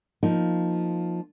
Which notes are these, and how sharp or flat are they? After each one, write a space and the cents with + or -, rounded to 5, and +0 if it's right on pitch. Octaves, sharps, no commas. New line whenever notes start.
F3 +5 A#3 +0 D#4 +0